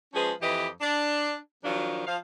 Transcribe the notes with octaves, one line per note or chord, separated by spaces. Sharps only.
F3 G#3 C#4 G#4 B4
F2 E3 G4 B4 D#5
D4
D#3 F3 F#3 D4 F4
F3 F5